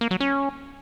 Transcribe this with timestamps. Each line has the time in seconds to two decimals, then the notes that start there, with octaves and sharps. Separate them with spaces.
0.01 A#3
0.11 F#3
0.20 C#4